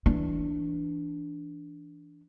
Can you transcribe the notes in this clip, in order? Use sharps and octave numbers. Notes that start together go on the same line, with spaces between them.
E3 D4